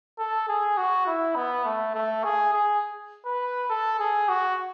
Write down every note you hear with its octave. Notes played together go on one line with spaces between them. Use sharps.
A4
G#4
F#4
E4
B3
A3
A3
G#4
G#4
B4
A4
G#4
F#4